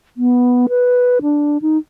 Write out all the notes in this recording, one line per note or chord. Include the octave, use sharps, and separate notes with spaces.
B3
B4
D4
D#4